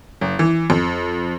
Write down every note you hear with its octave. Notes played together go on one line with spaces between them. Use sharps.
F#1
E3
F2